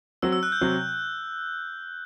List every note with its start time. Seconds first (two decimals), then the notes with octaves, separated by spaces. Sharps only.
0.22 F#3 C4 F#4 E6
0.33 E6
0.43 F#6
0.52 G6
0.61 C3 F#3 C4